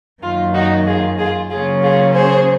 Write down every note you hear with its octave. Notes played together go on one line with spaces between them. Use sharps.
F#2 D#3 A#3 F4
D#4 F#4
F4 G#4
F4 G#4
C#3 F#3 A#3 C#4 F4 G#4
F4 G#4
G#4 C5